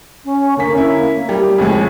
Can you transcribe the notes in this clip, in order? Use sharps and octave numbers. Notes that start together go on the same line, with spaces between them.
C#4
D3 A#3 B6
C#4 E4
A#3
G3
F2 A2 C#3 G#3